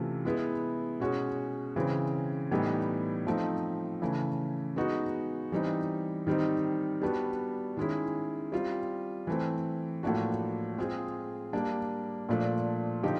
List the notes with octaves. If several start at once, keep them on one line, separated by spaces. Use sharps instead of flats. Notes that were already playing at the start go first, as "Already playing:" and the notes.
Already playing: C3 E3 A3 C#4 F4
G#3 B3 E4
B2 G#3 C#4 F#4
C#3 E3 G#3 C4
A2 E3 G3 B3 D#4
F3 A3 C4 D#4
C#3 E3 A3
G#3 B3 D#4 F#4
E3 G3 C4 D#4
D#3 G3 C4 D#4
G3 B3 D4 F#4
D#3 G#3 C#4 E4
G3 C4 F4
E3 A3 C4
A2 F3 A#3 D4 F#4
G#3 C4 F4 G#4
G3 A#3 D4
A#2 F3 A3 D4
D3 F3 D#4 G4